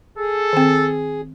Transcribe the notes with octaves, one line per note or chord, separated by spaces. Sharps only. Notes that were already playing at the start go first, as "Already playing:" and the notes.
G#4 A4
D#3 C4